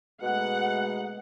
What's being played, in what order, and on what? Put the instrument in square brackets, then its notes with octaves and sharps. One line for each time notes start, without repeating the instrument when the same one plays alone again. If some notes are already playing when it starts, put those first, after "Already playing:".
[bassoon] B2 [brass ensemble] G#3 A3 D#4 [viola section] F#5